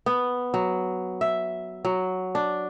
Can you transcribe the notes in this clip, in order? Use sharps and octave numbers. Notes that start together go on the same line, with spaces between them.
B3
F#3
E5
F#3
D4